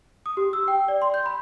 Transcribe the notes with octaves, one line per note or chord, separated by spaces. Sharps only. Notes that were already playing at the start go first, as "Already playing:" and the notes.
D#6
G4
E6
G5
D5
C6
G6
B5